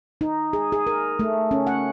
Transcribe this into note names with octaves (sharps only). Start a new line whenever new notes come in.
D#4
G#4
G#4
A#4
A3
C#4
F#5